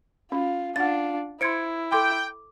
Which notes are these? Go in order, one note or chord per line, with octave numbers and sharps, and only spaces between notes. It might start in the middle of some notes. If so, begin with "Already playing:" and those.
C#4 F4
D4 F4 F5 F#5 A6
E4 C5 C6 G#6 C#7 D7
A4 G5 C6 D6